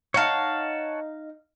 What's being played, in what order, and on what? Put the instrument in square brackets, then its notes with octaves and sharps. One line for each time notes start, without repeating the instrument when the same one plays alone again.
[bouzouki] D#4 F5 [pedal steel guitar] C#5 F#5 A5